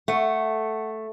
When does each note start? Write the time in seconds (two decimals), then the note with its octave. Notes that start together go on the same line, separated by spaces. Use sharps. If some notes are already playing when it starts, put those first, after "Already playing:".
0.08 A3 F#5